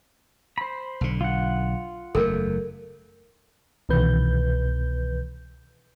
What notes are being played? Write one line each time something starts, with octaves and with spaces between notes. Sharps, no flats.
C5 B5
B1 D3
F4 F#5
F#1 E2 A3 A4 A#4
C2 B2 D#3 E3 B4 G6